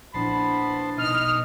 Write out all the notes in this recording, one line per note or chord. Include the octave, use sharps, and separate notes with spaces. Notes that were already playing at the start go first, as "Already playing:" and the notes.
A#1 B3 D4 E4 C5 A5 B5
B2 D#4 D#5 F6